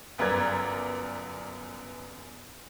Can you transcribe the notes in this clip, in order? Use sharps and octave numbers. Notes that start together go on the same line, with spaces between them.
G1 F#2 B3 A#4 D5 G#6